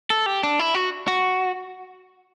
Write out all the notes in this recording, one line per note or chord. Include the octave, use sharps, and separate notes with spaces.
A4
G4
D4
E4
F#4
F#4